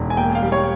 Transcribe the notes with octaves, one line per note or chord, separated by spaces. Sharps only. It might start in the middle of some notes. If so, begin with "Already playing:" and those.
Already playing: E1
G#5
A#3 G5
F5
G3
C#5